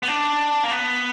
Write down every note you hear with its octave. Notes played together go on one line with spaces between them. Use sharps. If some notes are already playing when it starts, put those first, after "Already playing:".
B3
D4
A#3
B3